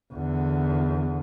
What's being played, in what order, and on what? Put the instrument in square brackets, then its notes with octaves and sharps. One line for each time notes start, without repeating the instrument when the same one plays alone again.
[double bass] E2 D3